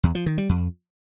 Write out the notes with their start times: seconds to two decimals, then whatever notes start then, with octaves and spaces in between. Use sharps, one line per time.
0.03 E2
0.15 F3
0.26 D#3
0.38 G3
0.49 F2